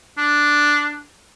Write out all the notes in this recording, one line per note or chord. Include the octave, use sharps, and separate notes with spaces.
D4